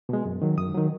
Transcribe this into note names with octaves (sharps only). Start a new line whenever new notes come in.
B2 G#3
F#2
D#3 F#3
F#2 D#6
D#3 F#3